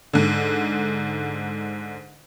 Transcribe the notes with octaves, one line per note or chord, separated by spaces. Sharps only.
G#2 D3